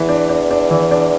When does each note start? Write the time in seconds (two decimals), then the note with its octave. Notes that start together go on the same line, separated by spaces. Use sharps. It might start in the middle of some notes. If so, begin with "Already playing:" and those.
Already playing: E2 E3
0.09 D4
0.29 D4
0.51 D4
0.71 E3
0.91 D4